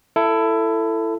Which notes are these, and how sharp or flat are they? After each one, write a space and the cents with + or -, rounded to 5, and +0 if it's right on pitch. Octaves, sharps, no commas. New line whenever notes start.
E4 +15 A4 +15